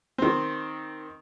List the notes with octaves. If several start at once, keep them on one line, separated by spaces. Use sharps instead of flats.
D#3 C4